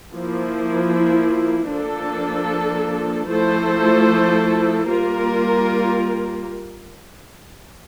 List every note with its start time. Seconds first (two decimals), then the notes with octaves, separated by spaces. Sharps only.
0.11 F3 A#3 E4
1.70 F3 A#3 D4 A4
3.29 F3 A3 E4 A4 C5
4.88 G3 A#3 F4 A#4